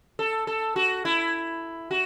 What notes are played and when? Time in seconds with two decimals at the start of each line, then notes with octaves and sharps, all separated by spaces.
0.19 A4
0.47 A4
0.76 F#4
1.05 E4
1.91 F#4